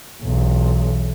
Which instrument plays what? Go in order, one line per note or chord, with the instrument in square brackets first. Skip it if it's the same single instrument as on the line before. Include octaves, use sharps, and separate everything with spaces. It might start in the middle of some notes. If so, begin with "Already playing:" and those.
[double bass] B1 E2